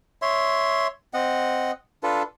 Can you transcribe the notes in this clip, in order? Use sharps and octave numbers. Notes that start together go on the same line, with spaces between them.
C#5 E5 C6
C4 D#5 F#5
D4 F4 A4 B4